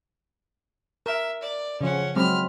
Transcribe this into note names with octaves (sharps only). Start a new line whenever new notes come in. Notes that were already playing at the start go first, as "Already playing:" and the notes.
A#4 E5
D5
C#3 F3 C#4 F#5
F#3 G#3 C4 B5 F6